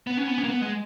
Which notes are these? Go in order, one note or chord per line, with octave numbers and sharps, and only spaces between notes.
B3
C#4
B3
C#4
A#3
B3
G#3